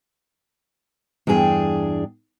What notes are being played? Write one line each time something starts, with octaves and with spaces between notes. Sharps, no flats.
E2 G2 D4 G#4 G5